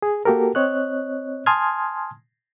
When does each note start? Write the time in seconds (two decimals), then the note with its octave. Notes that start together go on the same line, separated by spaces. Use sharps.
0.02 G#4
0.25 A#3 F#4 G4 A4 A#4
0.55 C4 C#5 D#5 F#6
1.46 G#5 A5 C6 D#6 F6 G#6